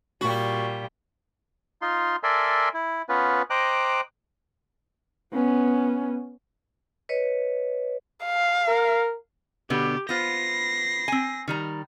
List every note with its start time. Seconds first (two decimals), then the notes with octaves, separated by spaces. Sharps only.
0.21 A#2 G3 F#4
1.82 D#4 F4 C6
2.23 A4 A#4 D5 E5 G#5 C6
2.74 E4
3.09 B3 C#4 F4 B4
3.50 C5 D#5 G5 A#5 D6 F#6
5.33 B3 C#4
7.09 B4 C#5 D#5
8.25 F5
8.68 A#4
9.70 B2 D3 B3 G4
10.09 B3 F4 C5 A#6 C7
11.08 C4 G#5
11.48 D#3 G3 A#5